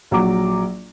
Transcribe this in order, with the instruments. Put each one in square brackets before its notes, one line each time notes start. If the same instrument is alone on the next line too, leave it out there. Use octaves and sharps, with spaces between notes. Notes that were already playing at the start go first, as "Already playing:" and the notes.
[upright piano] A#1 F#3 A#5 D6